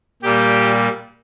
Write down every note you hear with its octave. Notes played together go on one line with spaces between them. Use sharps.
A#2 G3 A#3 G4